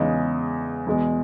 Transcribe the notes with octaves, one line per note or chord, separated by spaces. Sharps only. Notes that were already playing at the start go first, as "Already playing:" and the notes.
Already playing: E2 C#3 G#3 D#4
E2 B2 G#3